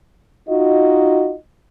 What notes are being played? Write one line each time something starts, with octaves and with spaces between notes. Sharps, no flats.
D#4 F4 F#4 D#5